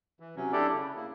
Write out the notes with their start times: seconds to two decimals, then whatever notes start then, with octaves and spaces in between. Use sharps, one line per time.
0.20 E3
0.36 C3 F#3 C#4
0.53 D4 E4 G4 A4 D5
0.74 C#3
0.96 A#3 E4